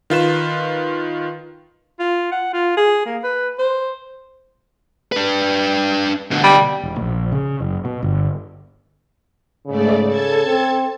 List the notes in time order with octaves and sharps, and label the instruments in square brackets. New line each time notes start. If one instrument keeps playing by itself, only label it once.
[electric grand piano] D#3 F4 B4 E7
[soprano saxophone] F4
F#5
F4
G#4
A#3
B4
C5
[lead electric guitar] D4 B4
B2 D3
[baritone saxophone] G3
[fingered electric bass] E1
A#1
C#3
F#1
B2
G1
[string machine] G#2 A3 D5 [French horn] C#3
[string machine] A4 A5 G#6
[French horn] C4